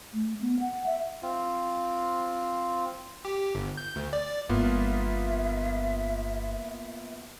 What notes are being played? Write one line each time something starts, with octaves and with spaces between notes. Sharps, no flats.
A3
B3
F#5
E5
C4 F4
G4
G1
G6
D2
D5
G1 E3 A#3 B3 F4 E5